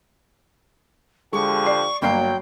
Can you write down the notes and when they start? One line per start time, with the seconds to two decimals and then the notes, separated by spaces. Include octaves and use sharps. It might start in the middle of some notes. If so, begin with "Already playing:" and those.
1.33 D3 F3 G#3 G4 C#6
1.66 D5 C7
2.02 G1 F#3 A#3 G5 C7